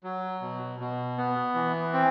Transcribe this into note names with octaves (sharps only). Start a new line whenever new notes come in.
F#3
B2
B2
B3
E3
C4